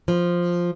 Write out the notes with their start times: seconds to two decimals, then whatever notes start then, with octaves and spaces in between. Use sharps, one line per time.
0.08 F3